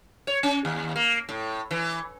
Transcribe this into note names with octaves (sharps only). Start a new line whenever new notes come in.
C#5
C#4
D#2
A#3
A2
E3